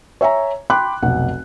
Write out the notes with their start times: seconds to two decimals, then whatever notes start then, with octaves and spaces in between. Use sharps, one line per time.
0.21 C#5 E5 G#5 A#5
0.70 G5 B5 C6 D6 F#6
1.02 F1 B1 F#5